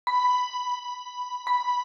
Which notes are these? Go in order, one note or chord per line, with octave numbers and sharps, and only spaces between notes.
B5
B5